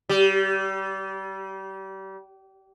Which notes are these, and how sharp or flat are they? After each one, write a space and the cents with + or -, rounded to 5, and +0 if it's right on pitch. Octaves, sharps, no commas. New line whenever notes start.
G3 -30